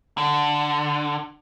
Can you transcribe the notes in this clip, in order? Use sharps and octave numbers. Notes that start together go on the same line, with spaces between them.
D3